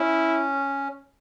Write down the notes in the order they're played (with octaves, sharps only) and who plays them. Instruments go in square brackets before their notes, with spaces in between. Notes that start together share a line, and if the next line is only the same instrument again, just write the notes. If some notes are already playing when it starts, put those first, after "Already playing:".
Already playing: [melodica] C#4 [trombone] E4